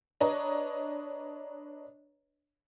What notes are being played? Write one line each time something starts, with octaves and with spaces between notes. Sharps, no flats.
D4 B4 C#5 D#5 A#5